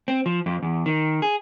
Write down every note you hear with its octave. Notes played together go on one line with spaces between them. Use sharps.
C4
F3
F2
E2
D#3
G#4